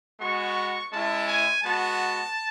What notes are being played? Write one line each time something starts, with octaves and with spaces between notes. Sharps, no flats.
G#3 B3 F#4 C#6
G#3 C#4 E4 A5
G#5
G#3 B3 F#4 A5